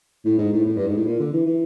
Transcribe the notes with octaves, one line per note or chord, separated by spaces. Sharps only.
A2
G#2
A2
A2
G2
G#2
A2
A#2
D3
E3
E3